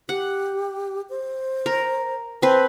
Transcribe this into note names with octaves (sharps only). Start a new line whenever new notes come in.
G4 F#5
C5
A#4
C4 B4 A5